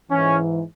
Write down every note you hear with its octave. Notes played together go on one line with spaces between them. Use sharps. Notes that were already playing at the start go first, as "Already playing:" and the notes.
G#2 E3 C#4